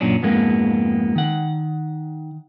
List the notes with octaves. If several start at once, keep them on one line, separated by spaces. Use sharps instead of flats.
F#2 A#2 C#4 D4
F2 G#2 G#3 A#3 B3
D#3 F#5